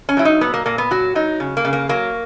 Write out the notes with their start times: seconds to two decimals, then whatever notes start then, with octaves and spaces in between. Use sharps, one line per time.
0.09 C#4
0.17 F#3 E4
0.25 D#4
0.41 A#2 B3
0.54 A#3
0.66 A#2 A#3
0.78 B3
0.91 F#3 F#4
1.15 F#3 D#4
1.40 C#3
1.57 A#3
1.65 C#3
1.73 A#3
1.89 F#3 A#3